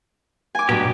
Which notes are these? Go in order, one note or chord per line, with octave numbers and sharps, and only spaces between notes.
G#5 D6
G2 B2 F#3 G4